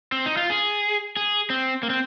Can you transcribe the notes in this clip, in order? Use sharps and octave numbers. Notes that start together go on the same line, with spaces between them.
C4
D#4
F4
G#4
G#4
C4
A#3
C4